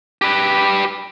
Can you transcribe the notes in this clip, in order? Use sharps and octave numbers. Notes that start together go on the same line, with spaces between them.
G4 B4